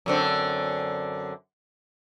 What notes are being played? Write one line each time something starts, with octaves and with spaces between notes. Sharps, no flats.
F#2 D3 C4